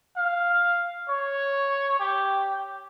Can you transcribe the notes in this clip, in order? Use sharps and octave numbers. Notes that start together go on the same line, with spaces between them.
F5
C#5
G4